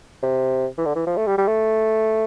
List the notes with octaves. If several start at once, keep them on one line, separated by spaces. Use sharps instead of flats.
C3
E3
D3
E3
F3
A3
G3
G3
A3